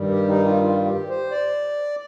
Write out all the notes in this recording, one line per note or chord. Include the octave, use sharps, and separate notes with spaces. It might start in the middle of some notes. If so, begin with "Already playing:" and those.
Already playing: G2 D#3 G3
G4
D#4
F4
F4
G4
C5
D5